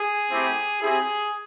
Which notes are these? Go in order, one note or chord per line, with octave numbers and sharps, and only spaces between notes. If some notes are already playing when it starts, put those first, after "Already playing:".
Already playing: G#4
A3 C4 E4 G4
C4 E4 G4 G#4